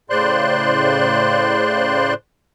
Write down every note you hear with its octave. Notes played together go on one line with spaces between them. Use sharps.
A2 C#3 C5 D5 C6 F#6